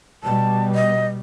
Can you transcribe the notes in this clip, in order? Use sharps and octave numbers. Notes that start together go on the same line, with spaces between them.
B2 G3 A5
D#5